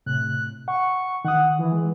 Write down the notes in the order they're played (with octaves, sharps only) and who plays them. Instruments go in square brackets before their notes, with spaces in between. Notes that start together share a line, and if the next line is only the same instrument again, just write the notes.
[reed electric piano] A2 C3 [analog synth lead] F#6
[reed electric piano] F#5 [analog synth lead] C#6
[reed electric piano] D#3 D#6 [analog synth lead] F#5
[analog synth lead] E3
[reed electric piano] G#3